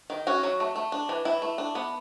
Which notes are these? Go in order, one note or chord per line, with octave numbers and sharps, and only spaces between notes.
D#3
C#4 F#4
F#3
A3
A3
D4
E3
E3 E4
A3
D4
B3